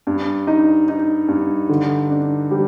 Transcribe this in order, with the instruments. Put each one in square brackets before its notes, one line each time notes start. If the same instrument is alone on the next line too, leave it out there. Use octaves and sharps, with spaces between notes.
[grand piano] G2
D#4
D#4
G2
D3
D4
G3